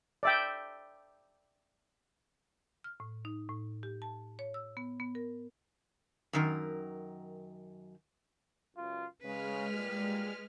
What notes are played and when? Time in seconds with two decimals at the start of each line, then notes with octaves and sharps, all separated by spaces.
0.23 D5 E5 G5
2.84 F6
3.00 A2
3.25 D#4
3.49 A2
3.83 G4
4.02 A5
4.39 C#5
4.54 E6
4.77 B3
5.00 B3
5.15 A#4
6.33 F#2 D#3 A#4
8.76 C#2 F#2 F4
9.22 C#3 G#3 B4 F6
9.72 A#2 G3